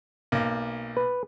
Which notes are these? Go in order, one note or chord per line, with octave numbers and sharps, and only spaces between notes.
B1 A#3
B4